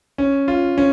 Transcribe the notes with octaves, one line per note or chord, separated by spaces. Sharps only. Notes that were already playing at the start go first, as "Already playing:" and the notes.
C#4
F4
C#4